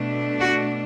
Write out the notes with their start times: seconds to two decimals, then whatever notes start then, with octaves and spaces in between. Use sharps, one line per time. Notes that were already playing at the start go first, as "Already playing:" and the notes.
Already playing: B2 A3 D4
0.40 F#4